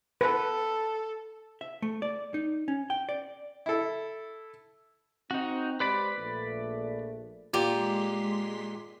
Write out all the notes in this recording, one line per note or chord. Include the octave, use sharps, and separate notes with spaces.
A4 B4
E5
A3
D5
D#4
C#4
G5
D5
E4 A4
C4 D#4 F#4
G#3 G4 B4 C5 D5 B5
A#1 A3
A#2 G#3 G4 C6 B6